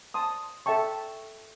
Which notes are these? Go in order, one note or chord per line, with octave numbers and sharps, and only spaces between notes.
A5 C6 D#6
A4 E5 G5 A5 C#6